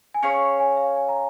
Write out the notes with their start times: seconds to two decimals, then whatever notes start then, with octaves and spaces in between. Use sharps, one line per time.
0.14 G#5
0.23 C#4 G#4 C#5 F5
0.60 G#5
0.77 F5
0.96 G#5
1.09 A#5